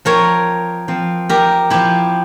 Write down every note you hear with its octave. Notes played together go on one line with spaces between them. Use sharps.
F3 C4 A#4 C#5
F3 C4
G4 A#4
F3 C4 E4 G4